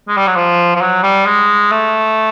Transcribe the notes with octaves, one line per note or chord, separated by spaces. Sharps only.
G#3
G3
F#3
F3
F3
F#3
G3
G#3
A3